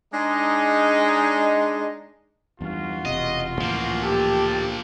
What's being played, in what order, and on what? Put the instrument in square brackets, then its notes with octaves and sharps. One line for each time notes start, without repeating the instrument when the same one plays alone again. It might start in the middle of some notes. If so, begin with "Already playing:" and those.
[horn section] G#3 D4 D#4
[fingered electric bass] E2 G2 [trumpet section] F4 F#4
[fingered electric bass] E1 C3 [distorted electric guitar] D#5
[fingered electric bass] C#2 A2 E3 [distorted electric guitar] F3 A#3
[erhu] G4 [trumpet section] A4 C5 A5